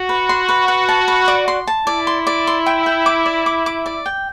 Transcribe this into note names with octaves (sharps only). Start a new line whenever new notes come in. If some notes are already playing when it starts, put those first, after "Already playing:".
Already playing: F#4
B4
C6
B4
B4
A5
B4
D5
C6
A5
E4 D5
C6
D5
C6
G5
G5
D6
D5
D6
D6
D5
G5